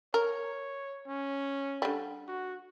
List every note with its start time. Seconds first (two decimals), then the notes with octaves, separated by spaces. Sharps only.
0.14 A#4 C#5
1.07 C#4
1.82 D3 G3
2.28 F#4